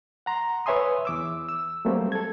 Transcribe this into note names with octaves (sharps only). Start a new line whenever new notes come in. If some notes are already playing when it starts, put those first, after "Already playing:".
F#5 A#5 C6
B4 C#5 E5 G#5 C6 D#6
E2 D6 E6
E6
F#3 G3 A3 A#3 C4
A4 G#6